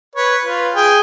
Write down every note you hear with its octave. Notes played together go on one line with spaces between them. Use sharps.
B4 C#5
F4 B4
G#4 G5